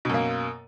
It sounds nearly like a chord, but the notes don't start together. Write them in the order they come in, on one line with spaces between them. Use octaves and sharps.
B2 F#2 A#3